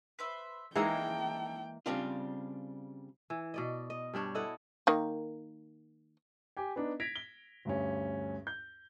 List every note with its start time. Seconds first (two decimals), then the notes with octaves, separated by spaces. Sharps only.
0.19 B4 C5 E5
0.76 E3 G#3 A#3 D#4 A4 G5 A#5
1.86 C#3 G3 C4 D4 F4
3.30 E3
3.54 B2 D5 D#5
3.90 D#5
4.14 G2 G3 D4 C#5
4.35 E4 A4 D#5 F#5
4.87 D#3 A#3
6.57 G4 G#5
6.76 B3 D4 D#4
7.00 G#6 A#6 B6 D7 F7
7.16 G7
7.65 D2 G2 C#4
8.47 G6